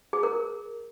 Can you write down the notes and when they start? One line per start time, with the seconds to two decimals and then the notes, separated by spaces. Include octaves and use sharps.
0.13 G#4
0.23 A#4